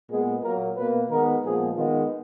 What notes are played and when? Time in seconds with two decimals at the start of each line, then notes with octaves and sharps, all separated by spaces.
0.10 A#2 G#3 B3 G#4
0.43 A#2 F#3 A#3 A#4
0.76 B2 A#3 B4
1.10 D#3 G#3 B3 A#4
1.43 A#2 F3 G#3 B3 G#4
1.76 D#3 G#3 B3 F4